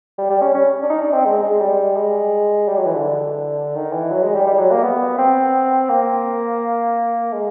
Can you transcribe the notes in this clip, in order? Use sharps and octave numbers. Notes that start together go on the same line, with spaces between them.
G3
G3
C#4
C#4
D4
D#4
D4
C4
G#3
G#3
G3
G#3
G3
F#3
E3
D3
D#3
E3
F#3
G#3
G3
G3
F#3
A#3
B3
C4
A#3
G#3